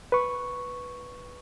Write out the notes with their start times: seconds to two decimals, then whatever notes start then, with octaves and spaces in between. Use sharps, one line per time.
0.12 B4 C#6